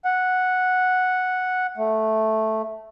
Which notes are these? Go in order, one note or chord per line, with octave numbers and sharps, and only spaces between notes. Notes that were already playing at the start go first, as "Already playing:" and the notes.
F#5
A3